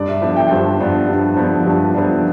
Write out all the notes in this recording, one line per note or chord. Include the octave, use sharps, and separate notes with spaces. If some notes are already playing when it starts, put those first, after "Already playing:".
Already playing: G2 D5
E5
F3 B3 D4 E5
G5
G2 C5
F3 B3 D4
G2
F3 B3 D4
G2
F3 B3 D4